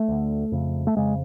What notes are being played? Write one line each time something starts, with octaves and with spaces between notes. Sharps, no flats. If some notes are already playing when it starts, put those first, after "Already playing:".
Already playing: A3
D2 D3
F2 C#3
A3
F2 C#3 G#3